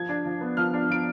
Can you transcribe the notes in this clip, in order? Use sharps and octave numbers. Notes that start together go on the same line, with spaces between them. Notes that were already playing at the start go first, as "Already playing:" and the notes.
Already playing: F3 G#6
D4
F3
B3
F3 F6
D4
F3 D7